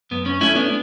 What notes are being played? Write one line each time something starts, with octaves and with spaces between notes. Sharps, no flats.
F#2 B3
C#4
A3 C#4 E4
B3 D4